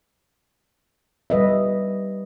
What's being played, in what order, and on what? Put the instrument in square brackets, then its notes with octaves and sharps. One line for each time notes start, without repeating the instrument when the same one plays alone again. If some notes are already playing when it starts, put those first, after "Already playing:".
[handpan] G3 B4 D#5 E5